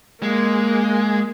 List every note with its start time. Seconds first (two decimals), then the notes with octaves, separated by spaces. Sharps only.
0.23 G#3 A#3